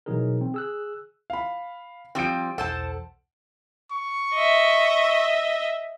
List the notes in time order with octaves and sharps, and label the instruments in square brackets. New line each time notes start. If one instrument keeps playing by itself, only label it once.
[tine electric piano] B2 E3 F#3 D#4 G#4 A#4
C4
G#4 E6 F#6
[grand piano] F5 B5
[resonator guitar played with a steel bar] F3 G3 C4 [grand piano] G5 D7
[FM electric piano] B1 E2 [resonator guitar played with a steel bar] A4 C5 A5 [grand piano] F#5
[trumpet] C#6
[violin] D#5 E5